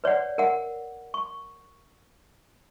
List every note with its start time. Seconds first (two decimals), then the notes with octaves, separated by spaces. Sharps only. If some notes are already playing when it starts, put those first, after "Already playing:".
0.04 B4 C#5 D5 F#5
0.38 A#4 F#5
1.14 C#6